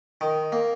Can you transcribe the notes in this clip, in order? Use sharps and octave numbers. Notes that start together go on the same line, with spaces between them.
D#3
A#3